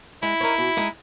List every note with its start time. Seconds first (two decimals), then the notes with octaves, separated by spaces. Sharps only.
0.22 G#3 E4
0.40 D#4 A#4 C#5
0.58 B2
0.77 G#3 D#4